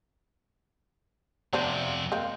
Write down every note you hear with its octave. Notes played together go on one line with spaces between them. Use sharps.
F2 C3 B3 D4 C5
G#3 A#3 C4